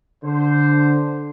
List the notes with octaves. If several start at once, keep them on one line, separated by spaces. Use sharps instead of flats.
D3 C5